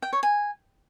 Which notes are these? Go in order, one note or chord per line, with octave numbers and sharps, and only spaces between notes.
G5
C#5
G#5